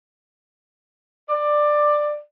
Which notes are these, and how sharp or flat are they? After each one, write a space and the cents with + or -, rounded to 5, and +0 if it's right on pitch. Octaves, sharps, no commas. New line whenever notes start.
D5 +15